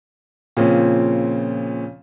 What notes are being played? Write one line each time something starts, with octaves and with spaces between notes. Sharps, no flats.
A#2 C#3 F3 C4 C#4